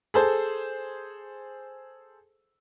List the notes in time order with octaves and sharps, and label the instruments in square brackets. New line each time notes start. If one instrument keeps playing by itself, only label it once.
[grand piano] G#4 A4 C5